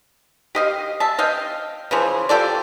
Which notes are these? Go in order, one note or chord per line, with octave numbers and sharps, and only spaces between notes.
G4 D#5 F5
E5 A5
D#5 F5 G5
C#3 E3 F3
F4 G4 A4 D5